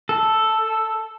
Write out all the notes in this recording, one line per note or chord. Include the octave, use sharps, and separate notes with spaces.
A4